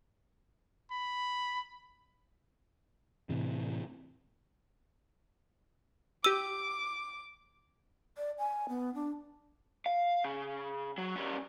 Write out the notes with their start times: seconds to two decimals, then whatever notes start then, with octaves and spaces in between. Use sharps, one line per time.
0.91 B5
3.29 A2 C3 E3
6.24 G4 D6 E6 D#7
8.17 D5
8.38 G#5
8.69 B3
8.94 D4
9.86 F5
10.24 C#3
10.98 F#3
11.16 G3 C#4